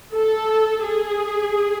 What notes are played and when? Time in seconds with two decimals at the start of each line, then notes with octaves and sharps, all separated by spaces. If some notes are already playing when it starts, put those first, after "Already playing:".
0.13 A4
0.84 G#4